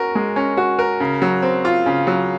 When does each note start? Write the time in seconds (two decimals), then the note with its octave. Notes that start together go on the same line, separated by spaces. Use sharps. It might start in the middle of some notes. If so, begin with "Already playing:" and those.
Already playing: C#4 F#4 A#4
0.15 G#3
0.36 C#4
0.57 F#4
0.79 A#4
1.00 C#3
1.22 F#3
1.42 C4
1.65 F4
1.86 C#3
2.07 F#3